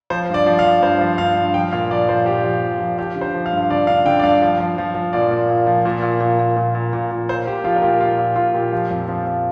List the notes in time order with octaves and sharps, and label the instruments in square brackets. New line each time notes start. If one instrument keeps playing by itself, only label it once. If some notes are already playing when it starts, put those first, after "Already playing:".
[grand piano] F3 C5
G2 D5
F3
F5
F3
G2 C5
F3
G2 F5
G2
F3 G5
A#2 F5
F3 D5
F3 C5
A#2 G4
F3
A#2
F3
F3 G4
D3
C5
F3
F5
G2
D3 D5
D3 F5
D3 G5
D5
G2 F5
F3
F3
F3
F3
A#2 D5
A#2
A#2
F3
A#2
A#2
A#2
A#2
A#2
A#2
A#2
A#2
A#2 C5
A#2 G4
F3 F4
A#4
A#2 G4
A#2 F4
A#2
A#2 F4
A#2 G4
F3
F2
F3
F3